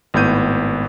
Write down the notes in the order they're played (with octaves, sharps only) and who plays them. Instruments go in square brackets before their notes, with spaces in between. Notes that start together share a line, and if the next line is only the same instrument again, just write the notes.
[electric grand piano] G#1 A2 B3 G6 D#7